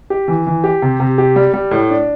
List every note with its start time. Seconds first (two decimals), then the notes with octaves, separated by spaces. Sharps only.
0.10 G4
0.28 E3
0.47 E3
0.64 G4
0.82 C3
1.00 C3
1.18 G4
1.36 G3
1.54 G3
1.71 A2
1.90 D4